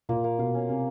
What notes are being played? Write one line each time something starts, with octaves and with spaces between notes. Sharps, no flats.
A#2 A#3
A#3
B2 F4
C#4
C3 A#3